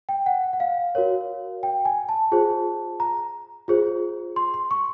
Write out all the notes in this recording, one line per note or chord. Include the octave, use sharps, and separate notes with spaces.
G5
F#5
F#5
F5
F#4 A#4 C#5
G5
G#5
A5
F4 G#4 C5
A#5
F4 G#4 C5
C6
C6
C#6